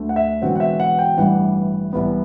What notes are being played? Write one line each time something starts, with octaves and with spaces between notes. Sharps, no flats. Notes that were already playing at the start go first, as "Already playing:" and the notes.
Already playing: D2 D3 A3
F#5
E5
E1 E2 D3 F#3 C4 F#5
F#5
E5
F#5
G5
A1 G2 E3 G3 F#5
C2 C3 E3 G3 B3